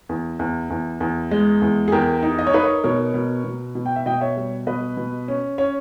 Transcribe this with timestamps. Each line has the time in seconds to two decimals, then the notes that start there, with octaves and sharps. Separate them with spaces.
0.09 E2
0.39 E2
0.70 E2
1.01 E2
1.31 G#3
1.62 E2
1.88 G#4
1.92 E2 G4 A#4
2.23 D#4
2.39 D#5
2.47 C#5
2.53 D#4 B4
2.63 A#4 C#5
2.84 B2 A#4 C#5
3.14 B2
3.44 B2
3.75 B2
3.86 G5
3.96 E5
4.06 B2 D#5 G5
4.21 C#5 E5
4.37 G3
4.67 B2 B4 D#5
4.97 B2
5.28 C#4
5.58 C#4 C#5